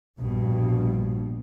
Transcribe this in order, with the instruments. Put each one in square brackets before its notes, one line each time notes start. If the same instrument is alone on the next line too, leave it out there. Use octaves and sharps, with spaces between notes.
[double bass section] A#1 G2 B2